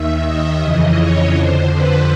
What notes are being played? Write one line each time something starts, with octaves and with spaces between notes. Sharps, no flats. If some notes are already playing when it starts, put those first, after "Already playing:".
Already playing: D#2 D#3 E5
D#5
F2 C#3 E3
C#5
F2 D3 C5
B4